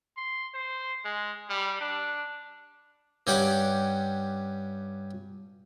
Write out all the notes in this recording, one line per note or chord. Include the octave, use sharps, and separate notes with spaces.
C6
C5
G#3
G3
D4
G2 C#4 G4 F#5 D6